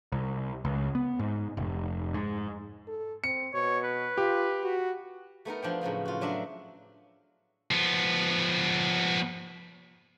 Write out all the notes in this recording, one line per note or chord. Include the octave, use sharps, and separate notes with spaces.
C2
C#2
B3
G#2
F1
G#2
A4
C4 C#7
B2 C#5
B4
F4 G4
F#4
A3 B3 D#4 A#4
F3 D4 G5
A2 C#3 F3 F#3
F4 F#4
F#3 D4 D#5 E5
F3 B3